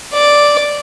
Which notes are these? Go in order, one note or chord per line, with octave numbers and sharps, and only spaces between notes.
D5